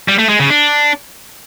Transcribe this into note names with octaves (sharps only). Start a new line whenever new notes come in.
G3
A3
G#3
C#3
D4